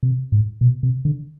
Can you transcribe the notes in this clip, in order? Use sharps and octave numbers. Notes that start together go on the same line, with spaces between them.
C3
G#2
B2
C3
D3